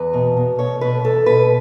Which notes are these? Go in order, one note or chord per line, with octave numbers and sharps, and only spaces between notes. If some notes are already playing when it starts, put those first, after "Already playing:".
Already playing: E2 B4
B2
B2
B2 C#5
B2 B4
E2 A4
B2 B4